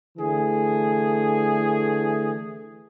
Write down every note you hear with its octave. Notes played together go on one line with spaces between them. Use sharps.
D3 E3 A3 G#4